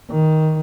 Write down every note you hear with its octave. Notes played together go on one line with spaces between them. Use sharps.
D#3